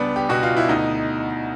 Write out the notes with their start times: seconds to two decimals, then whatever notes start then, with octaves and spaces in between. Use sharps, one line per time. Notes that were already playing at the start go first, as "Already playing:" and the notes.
Already playing: C#2 G3 B3 D4
0.16 G4
0.29 B2 F#4
0.43 F4
0.57 E4
0.69 D2 D#4